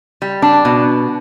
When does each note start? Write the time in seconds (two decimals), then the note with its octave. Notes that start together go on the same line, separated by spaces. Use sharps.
0.22 G3
0.42 D4
0.65 B2